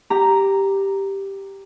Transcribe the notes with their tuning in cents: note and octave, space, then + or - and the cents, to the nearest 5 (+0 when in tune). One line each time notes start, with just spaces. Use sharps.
G4 +0 A#5 +0